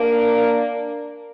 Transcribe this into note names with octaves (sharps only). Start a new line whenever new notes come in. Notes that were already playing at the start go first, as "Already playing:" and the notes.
Already playing: A#3 D4